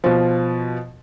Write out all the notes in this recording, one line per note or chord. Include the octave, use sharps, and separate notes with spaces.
B2 F3